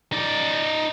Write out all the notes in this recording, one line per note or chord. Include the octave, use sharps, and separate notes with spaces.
D#4 D5